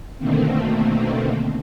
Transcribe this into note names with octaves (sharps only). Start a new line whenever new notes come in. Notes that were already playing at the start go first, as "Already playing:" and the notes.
B2 D3 D#3 A3 A#3 C4